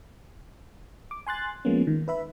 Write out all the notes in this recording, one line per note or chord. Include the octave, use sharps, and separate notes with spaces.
D6
G#5 C6 F#6 A6
F3 G#3 A#3 B3 C#4
D#3
B4 E5 B5